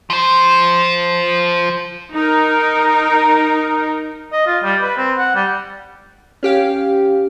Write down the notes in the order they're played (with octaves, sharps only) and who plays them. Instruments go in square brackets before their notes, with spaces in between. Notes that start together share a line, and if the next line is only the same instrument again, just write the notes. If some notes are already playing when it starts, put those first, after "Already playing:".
[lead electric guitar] F3 C5
[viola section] D#4 A#4
[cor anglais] D#5
F4
G3
B4
C4
F#5
G3
[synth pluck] C#4 G4 F5